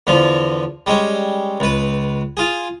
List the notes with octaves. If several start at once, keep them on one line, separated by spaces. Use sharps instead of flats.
E2 D3 F3
G3 G#3 C#4
C#2 B4
F4 G#4